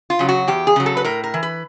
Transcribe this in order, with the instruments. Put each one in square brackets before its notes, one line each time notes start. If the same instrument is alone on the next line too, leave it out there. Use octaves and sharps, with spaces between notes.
[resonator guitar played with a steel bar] F4
C#3 F#3
F#4
E2 G4
G#4
C#3 F#3
A4
B4
A2 A#4
A#4
E3
B4